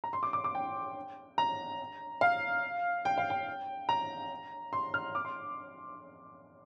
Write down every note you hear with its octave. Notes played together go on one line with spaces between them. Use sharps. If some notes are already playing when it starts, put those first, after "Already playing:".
A#5
C6
D6
D6
D6
G5
A#5
F5
G5
F5
G5
A#5
C6
F6
D6
C6